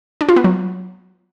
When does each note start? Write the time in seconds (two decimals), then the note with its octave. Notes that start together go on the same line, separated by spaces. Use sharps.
0.21 D4
0.29 F4
0.36 B3
0.44 F#3